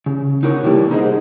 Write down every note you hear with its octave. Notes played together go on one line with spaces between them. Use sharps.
C#3
D#4 F#4 A#4 C#5
C3 E3 G3 A#3 D4
D#4 G#4 C5 D#5 F#5